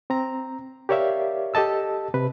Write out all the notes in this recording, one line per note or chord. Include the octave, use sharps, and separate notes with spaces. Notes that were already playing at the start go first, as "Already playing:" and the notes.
C4 A#5
G4 A#4 C#5 D5 E5 F5
G4 A4 D#5 A5 E6
C3 B4